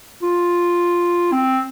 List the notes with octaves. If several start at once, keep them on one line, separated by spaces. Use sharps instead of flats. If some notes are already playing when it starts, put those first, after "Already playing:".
F4
C4